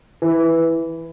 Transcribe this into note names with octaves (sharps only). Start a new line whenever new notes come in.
E3